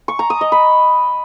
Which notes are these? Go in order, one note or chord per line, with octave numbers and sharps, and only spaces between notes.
C#6
A#5
D#6
D#5
B5